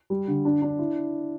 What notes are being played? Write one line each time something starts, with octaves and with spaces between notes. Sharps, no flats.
G3
D3
D4
D4
E4